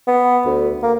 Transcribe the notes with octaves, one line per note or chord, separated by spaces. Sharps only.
B3
D2
A#3